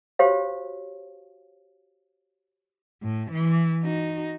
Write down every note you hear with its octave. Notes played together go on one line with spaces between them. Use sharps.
F#4 G4 C5 C#5 F5
A2
E3
D#4 F#4